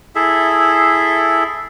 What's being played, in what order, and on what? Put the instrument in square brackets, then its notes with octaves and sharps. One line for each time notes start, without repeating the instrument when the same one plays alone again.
[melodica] E4 G#4 A4 E5